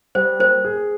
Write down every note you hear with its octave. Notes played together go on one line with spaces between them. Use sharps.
G3 C5
A#3 C5
G#4